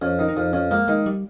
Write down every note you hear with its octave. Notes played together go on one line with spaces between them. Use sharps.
F2 C#4
D#3
D#4
F2
F2 C#4
G#3 A#3
D#3 G#3
G3